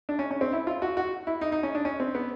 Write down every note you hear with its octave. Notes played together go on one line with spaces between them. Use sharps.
D4
C#4
C#4
C4
E4
F4
F#4
F#4
E4
D#4
D#4
C#4
D4
C#4
C4
B3